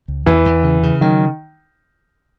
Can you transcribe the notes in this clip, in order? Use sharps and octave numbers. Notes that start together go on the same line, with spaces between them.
C#2
E2 E3
E2
C#3
C#3
D#3 F#3